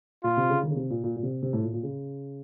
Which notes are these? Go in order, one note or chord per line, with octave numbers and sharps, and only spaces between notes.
A#2 F4
C3
C#3
D#3
C#3
C3
A#2
A#2
A#2
C3
C3
A2
A#2
A#2
C#3